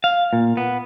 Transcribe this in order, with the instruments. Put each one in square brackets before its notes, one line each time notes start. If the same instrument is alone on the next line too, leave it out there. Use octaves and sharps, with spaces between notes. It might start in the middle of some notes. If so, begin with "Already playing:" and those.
[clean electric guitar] F5
A#2
B3